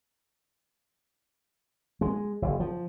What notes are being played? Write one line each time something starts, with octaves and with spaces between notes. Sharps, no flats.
G#3
F#1
F3